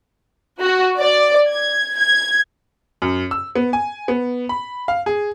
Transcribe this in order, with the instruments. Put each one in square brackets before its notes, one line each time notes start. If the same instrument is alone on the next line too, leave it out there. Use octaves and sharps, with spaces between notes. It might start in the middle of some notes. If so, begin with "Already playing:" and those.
[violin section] F#4
D5
G#6
G#6
[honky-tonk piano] F#2
E6
B3
G#5
B3
B5
F5
G#4